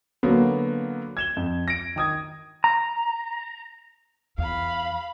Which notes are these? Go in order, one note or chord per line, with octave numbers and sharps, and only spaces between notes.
D3 F#3 A#3 B3
G#6 E7 G7
F2
A#6 D7
D#3 D#6 G#6
A#5
E2 F5 B5